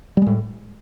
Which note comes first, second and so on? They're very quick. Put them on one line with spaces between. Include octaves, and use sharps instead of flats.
G3 G#3 A2